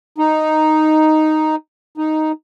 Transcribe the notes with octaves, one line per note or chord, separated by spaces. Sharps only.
D#4
D#4